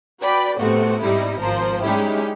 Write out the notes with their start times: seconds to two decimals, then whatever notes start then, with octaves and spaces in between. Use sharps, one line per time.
0.21 F#4 B4 D5 G5 B5
0.59 A2 C3 A3 B3 C4 F#4
1.02 G#2 G3 D#4 E4
1.39 G#1 F3 A#4 C5
1.82 G3 G#3 C#4 D#4 E4 G4